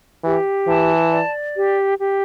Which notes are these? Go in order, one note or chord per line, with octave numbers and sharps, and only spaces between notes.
E3 G4
E3 A5
D5
G4
G4